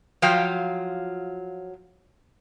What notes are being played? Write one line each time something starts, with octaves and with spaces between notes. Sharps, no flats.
F3 F#3 F4 F5 G5